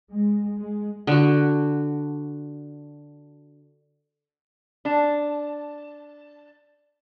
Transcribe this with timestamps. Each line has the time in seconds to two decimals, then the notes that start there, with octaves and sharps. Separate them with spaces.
0.11 G#3
0.59 G#3
1.07 D3 F#4
4.85 D4 A5